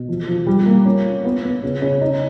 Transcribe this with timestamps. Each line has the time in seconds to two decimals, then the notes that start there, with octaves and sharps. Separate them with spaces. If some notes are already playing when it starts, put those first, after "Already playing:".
Already playing: B2
0.09 F3
0.27 F3
0.46 G3
0.66 A#3
0.85 C#4
1.05 F4
1.25 B3
1.44 B3
1.63 C#3
1.82 C#3
2.01 D#4